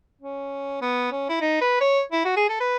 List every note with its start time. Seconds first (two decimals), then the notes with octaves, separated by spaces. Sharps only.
0.21 C#4
0.81 B3
1.12 C#4
1.29 E4
1.41 D#4
1.61 B4
1.81 C#5
2.12 E4
2.25 F#4
2.37 G#4
2.49 A4
2.60 B4